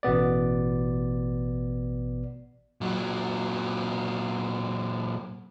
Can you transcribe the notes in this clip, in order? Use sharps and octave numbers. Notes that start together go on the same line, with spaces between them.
A1 B2 B3 D5
A#2 F#3